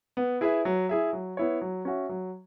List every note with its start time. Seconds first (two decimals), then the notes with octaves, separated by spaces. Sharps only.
0.17 B3
0.41 E4 G#4 B4 E5
0.65 F#3
0.89 E4 G#4 E5
1.13 F#3
1.37 B3 E4 C#5
1.62 F#3
1.85 C#4 F#4 E5
2.09 F#3